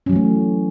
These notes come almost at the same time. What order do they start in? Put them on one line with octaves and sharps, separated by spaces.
C#4 F#3 E3 A3